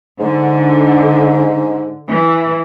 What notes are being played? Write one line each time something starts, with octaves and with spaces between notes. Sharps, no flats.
G#2 D3
E3